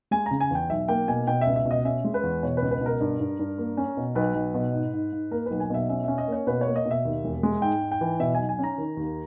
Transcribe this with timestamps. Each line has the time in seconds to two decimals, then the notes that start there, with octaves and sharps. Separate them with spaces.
0.11 G#3 G#5
0.26 C#3 A#5
0.41 G#5
0.51 E2 G5
0.70 B1 E5
0.88 A#3 G5
1.08 B2 G#5
1.27 B2 G5
1.41 E5
1.47 C#2
1.56 E5
1.65 B2
1.71 D#5
1.85 C#4 E5
2.04 G#3
2.14 B4
2.23 E2
2.43 B2 C#5
2.57 C#2 B4
2.71 B4
2.81 B2 A#4
3.01 G2
3.20 G2
3.39 G2
3.58 A#3
3.77 C#4
3.97 B2
4.15 B1 B4
4.35 B1
4.54 B2
4.74 G#2
4.93 G#2
5.12 G#2
5.31 A#3 A#4
5.46 B1 B4
5.60 G#5
5.70 B2 E5
5.89 C#4 E5
6.04 C#4 E5
6.18 D#5
6.28 A#3 C#5
6.47 B2 B4
6.61 C#5
6.66 A#3
6.76 D#5
6.85 B2
6.91 E5
7.05 D#2
7.24 E1
7.43 G#3
7.62 G#2 G5
7.82 G#2
7.92 G5
8.01 E3
8.20 B2 E5
8.35 B1 G#5
8.49 G#5
8.59 C#4 A#5
8.78 D#3
8.97 D#2